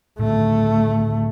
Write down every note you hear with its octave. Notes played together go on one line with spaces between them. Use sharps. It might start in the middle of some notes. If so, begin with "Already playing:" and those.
A2 D3 D#3 A3